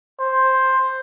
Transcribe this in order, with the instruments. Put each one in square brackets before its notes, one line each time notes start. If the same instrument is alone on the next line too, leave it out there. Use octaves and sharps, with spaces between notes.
[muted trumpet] C5